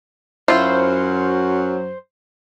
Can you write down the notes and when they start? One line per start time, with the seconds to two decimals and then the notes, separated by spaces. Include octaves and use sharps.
0.48 F#2 F#3 E4 F4 C5